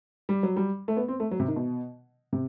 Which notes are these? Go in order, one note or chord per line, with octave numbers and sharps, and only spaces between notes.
G3
F#3
G3
A3
B3
C4
A3
F#3
C3
D#3
B2
C3